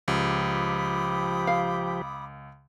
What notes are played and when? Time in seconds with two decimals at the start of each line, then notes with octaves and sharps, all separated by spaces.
0.08 C#2 F3 G4 B5 D6 D#6
1.47 F5